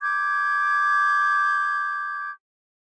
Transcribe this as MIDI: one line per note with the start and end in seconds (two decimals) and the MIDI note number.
0.01 2.30 86
0.01 2.30 91
0.01 2.30 92